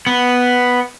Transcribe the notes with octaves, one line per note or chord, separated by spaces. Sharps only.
B3